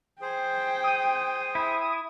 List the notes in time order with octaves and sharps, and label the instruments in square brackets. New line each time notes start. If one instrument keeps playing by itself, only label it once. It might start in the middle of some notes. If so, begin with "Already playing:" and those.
[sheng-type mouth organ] G#4 C5 [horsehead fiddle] G5
[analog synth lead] D#6
[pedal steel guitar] E4